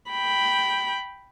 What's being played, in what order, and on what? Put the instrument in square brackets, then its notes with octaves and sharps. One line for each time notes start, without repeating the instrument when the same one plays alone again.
[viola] G5 B5